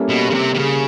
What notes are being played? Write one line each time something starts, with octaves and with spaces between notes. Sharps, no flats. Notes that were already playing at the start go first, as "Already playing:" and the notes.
Already playing: G3 A#3 C#4 E4 A4
B2
C#3
C3
C3
C#3